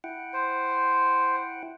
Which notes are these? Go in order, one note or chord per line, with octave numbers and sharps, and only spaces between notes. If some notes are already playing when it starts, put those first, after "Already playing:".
E4 F#5 G5
C5